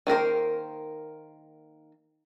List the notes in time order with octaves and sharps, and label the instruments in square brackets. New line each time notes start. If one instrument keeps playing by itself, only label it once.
[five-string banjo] D#3 A#3 A#4 C5